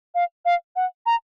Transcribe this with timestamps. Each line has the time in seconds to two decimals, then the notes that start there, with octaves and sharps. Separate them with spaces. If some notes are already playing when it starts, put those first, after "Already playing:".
0.15 F5
0.45 F5
0.76 F#5
1.06 A#5